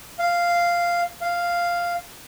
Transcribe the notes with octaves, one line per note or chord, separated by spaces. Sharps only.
F5
F5